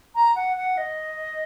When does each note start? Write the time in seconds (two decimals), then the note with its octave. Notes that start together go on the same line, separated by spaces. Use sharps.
0.15 A#5
0.36 F#5
0.57 F#5
0.77 D#5